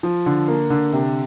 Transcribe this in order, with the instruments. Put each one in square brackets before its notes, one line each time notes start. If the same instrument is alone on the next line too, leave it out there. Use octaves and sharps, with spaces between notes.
[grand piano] F3
D3
A#3
D3
C3